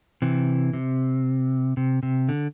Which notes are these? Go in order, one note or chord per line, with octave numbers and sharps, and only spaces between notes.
C3 E3
C3
C3
C3
D3